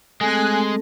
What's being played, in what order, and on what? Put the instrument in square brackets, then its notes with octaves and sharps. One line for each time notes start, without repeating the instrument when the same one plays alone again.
[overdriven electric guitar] G#3 [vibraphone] A3 C4 A4 [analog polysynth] G#5 F#6